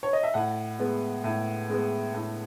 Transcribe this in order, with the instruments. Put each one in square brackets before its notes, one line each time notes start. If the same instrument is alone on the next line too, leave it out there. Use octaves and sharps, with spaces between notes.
[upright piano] C#5
D#5
E5
A2 F#5
G#3 B3
A2
G#3 B3
A2